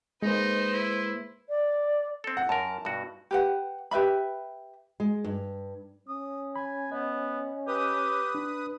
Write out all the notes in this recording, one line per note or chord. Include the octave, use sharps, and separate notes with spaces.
G#3 A#3 D#4 B4 C5
E4
D5
C4 A4
F#5
F#2 A#4 A5
G2 B2 F#4
G4 B4 F#5
G4 B4 E5 B5
G#3
G2
C#4 D#6
G#5 B5
B3 D#5
G4 B4 D#6
D4